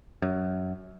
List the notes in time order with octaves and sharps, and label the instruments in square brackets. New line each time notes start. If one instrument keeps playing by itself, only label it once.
[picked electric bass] F#2